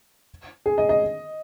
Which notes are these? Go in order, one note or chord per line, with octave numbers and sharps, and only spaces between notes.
G#4
D#5
D#5